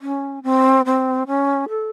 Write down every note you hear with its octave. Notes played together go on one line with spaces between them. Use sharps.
C#4
C4
C4
C#4
A4